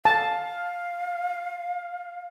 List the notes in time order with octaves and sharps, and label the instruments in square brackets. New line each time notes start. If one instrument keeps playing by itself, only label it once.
[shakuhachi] F5 [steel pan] A5